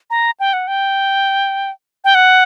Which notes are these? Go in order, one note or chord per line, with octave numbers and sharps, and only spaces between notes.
A#5
G5
F#5
G5
G5
F#5